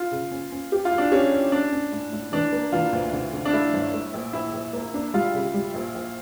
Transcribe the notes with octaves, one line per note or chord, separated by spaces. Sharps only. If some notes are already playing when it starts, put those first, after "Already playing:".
Already playing: F4
C#3
C#4
C#4
G4
F4
E4
D4
C#4 G4
E4
C#4 D4
C#4
A2
A2
E3 D4
A#3
E3 F4
D2
D3
D3
D4
A3 E4
G1
A3
A#1
A#1 E4
A#1
A#3
D4
G3 F4
C#3
G3
A#1
A#1